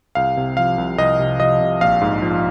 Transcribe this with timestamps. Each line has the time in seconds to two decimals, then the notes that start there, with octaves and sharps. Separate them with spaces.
0.15 C2 F5
0.37 C3
0.57 F3 F5
0.78 C2
0.98 C2 D#5
1.19 C3
1.40 F3 D#5
1.60 C2
1.81 A#1 F5
2.01 G#2
2.22 F3